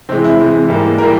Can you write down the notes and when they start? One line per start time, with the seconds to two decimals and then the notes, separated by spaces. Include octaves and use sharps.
0.09 C3 E3 G#3 C4
0.24 E4
0.39 C3 E3 G#3
0.68 G#2 E3 G3 A#3
0.98 E3 G3 A#3 A#4